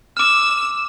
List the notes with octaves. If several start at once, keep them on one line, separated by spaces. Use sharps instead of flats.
D6 E6 F6 E7